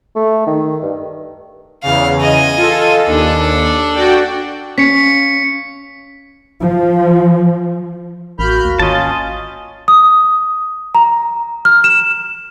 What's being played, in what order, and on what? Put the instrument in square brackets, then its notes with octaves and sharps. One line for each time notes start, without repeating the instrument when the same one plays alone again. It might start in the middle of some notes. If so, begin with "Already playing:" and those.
[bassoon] A3
D#3
G2
[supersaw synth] E2 C#3 [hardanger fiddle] F5
[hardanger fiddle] D#5 G#5
[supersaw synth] F4 A4
[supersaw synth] D#2 [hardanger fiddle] D4 A4
[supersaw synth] F#4 D5 G5
[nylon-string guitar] C#4 F5 [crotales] B6 C#7
[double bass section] F3
[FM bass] A1 [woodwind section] A#3 F#4 [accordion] B5 F6 G6
[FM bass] D2
[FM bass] G#1 [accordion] C#4 F4 [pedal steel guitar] D#5 A5
[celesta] D#6
A#5
F6
E7